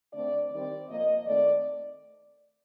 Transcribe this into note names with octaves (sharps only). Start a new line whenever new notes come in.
D3 A3 C4 D5
D#3 G3 C4 D5
A#2 F3 A#3 D#5
D#3 A3 C4 D5